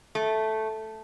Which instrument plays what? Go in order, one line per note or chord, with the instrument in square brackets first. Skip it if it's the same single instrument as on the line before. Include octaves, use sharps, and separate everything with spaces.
[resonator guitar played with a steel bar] A3